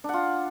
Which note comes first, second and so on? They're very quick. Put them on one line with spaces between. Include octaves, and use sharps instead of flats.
D4 F#5 F4